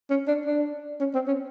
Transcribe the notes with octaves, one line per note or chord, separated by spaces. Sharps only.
C#4
D4
D4
C#4
C4
C#4